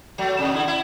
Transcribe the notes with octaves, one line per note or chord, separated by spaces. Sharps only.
F#3 A3
C3 D#3
D3 E4
E4